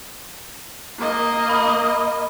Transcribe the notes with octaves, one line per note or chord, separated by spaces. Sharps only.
A#3 D#5
B5